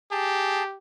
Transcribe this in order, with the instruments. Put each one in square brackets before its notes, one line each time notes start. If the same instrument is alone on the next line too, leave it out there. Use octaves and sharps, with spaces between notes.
[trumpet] G4 [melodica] G#4 A5